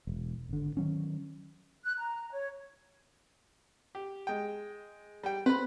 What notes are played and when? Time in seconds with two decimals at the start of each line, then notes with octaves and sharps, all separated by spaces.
0.07 E1
0.49 G#1 D3
0.77 D#3 F#3 C#4
1.84 F#6
1.98 A#5
2.32 C#5
3.95 G4
4.27 G#3 G5
5.23 G3 G5
5.46 C4 B4 B5